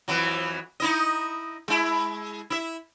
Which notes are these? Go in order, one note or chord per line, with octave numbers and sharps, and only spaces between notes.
F2 E3 F#3
D#4 E4 D#5
G#3 E4
E4 E5